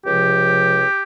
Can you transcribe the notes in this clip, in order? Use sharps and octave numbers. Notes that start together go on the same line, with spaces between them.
C#2 C3 F3 G4